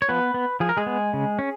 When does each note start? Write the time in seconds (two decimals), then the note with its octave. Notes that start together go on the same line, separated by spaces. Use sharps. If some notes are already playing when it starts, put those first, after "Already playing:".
0.02 C#5
0.09 F3 B3 B4
0.34 B3
0.60 F3 G#4
0.69 A#4
0.77 G#3 G#4
0.86 B3
1.14 C#3
1.39 C#4